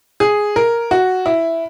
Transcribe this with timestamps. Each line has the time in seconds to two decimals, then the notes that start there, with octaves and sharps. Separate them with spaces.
0.20 G#4
0.56 A#4
0.91 F#4
1.26 E4